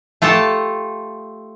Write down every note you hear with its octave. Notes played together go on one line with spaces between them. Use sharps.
A3 F4 G4 A4 A5